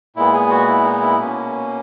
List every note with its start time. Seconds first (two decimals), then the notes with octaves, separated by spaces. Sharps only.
0.16 A#2 G#3 B3 E4
0.33 G#4
0.50 F#4
0.67 E4
0.84 D#4
1.02 E4
1.18 B2 A#3 C#4